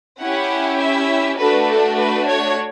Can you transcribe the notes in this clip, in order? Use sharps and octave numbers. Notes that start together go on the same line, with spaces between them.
C#4 E4 G4 F#5
E5
A3 D4 F#4 A4 B4
A4
B4
C#5